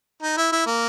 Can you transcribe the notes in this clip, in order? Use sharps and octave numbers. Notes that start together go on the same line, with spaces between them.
D#4
E4
E4
A#3